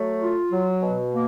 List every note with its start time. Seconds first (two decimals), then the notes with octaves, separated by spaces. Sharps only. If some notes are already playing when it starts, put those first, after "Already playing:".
Already playing: F#3 A3
0.22 F4
0.52 F#3
0.82 B2
1.12 A#3